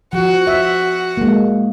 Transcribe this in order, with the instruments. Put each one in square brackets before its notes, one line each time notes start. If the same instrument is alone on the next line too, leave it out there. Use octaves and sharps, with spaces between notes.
[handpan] F3 [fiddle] F#4
[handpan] E5
G#3 A#3